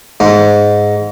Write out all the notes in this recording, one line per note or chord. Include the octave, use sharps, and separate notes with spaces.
G#2